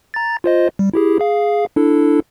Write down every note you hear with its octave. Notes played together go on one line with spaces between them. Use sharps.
A#5 A6
F4 C5 D#5
G3
E4 G4 G#4
G#4 F5
D4 E4 A4